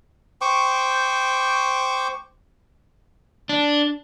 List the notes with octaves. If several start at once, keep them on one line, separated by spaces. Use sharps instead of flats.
C5 G5 C#6 D6
D4